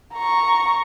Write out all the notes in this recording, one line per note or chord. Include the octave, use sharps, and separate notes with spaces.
A#5 C#6